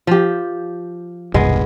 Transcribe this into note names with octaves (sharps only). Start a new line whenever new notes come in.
F3 G4
E1 C2 G2 G#3 B3